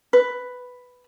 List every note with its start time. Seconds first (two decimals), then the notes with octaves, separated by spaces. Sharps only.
0.13 B4